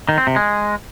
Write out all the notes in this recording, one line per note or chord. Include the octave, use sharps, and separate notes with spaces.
D#3
C4
C3
G#3